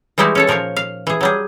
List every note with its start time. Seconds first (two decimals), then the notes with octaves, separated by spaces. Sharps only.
0.18 E3 G3 G#3 D#4 E4 F#4
0.35 C#4 A4 C#5
0.47 A#2 F3 A#4 C#5 F5
0.76 F5
1.07 E3 G#4
1.21 F#3 G3 G#4